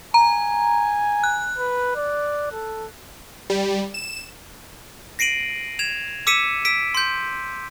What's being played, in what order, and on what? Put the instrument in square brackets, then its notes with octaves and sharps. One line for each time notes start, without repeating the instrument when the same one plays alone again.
[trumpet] G#5 [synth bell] A#5
[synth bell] F#6
[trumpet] B4
D5
A4
[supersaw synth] G3
E7
[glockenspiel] A#6 C7 D7 D#7 F#7
G#6 E7 F7
D6 E6 B6 C#7 D#7 E7
E6 B6 D7
C6 G6